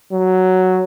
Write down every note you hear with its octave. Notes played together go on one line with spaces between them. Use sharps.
F#3